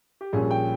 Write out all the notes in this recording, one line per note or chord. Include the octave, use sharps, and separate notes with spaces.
G4
A#1 A#2 G3 C#4 G#4
G5